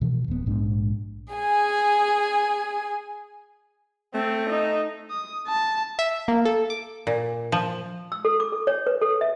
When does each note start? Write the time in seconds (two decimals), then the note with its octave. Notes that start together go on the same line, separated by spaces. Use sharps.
0.01 B2 E3 F3
0.28 D#1 B3
0.46 A#1 G#2 D4
1.34 G#4 G#5
4.14 A3 C4
4.50 D#4
5.10 D#6
5.48 A5
5.99 E5
6.28 A#3
6.45 A4
6.70 D6
7.07 A#2
7.52 F3
8.12 E6
8.25 A4
8.40 D6
8.52 A4
8.67 C#5
8.87 B4
9.01 A4
9.21 E5